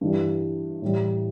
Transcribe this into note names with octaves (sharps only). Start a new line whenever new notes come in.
G2 E3 G3
A2 E3 G3